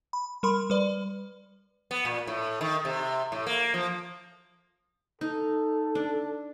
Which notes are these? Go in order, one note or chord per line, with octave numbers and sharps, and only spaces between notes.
B5
G3 A#4 B5 C6
G3 B4 D5
B3
A#2
A2
D#3
C3
A2
A#3
F3
D#4 A4
D4